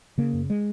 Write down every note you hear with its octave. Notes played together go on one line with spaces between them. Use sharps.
C#3 A#3
F#2
G#3